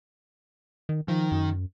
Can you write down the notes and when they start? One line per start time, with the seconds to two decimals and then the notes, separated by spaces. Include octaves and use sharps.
0.89 D#3
1.08 D#3 F3
1.32 F#2